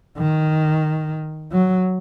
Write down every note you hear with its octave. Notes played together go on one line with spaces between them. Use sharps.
D#3
F#3